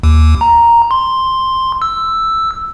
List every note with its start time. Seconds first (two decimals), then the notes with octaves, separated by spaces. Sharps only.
0.03 D#2
0.41 A#5
0.91 C6
1.82 E6